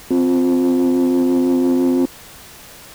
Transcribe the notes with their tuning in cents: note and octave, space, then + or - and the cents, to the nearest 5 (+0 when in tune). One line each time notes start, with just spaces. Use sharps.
C4 +0 F4 +20